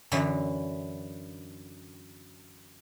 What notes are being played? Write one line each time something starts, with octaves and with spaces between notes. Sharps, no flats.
F#2 D3 E3 F#3